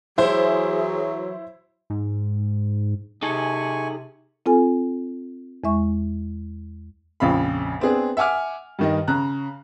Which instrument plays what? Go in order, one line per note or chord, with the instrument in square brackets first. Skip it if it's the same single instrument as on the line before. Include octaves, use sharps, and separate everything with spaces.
[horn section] E3 F#3 [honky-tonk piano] E4 C5 [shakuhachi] G#4
[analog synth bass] G#2
[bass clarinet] C3 [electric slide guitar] D#4 G#4 A4 [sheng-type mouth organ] G#5 C#6
[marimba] C4 F4 A4 G#5
E2 G#3 E5 C#6
[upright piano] A#1 F2 C#3 F5 B5
B3 C4 D4 G#4
E5 F#5 G#5 D6 F6
G2 D#3 D#5
C#3 A#5 F#6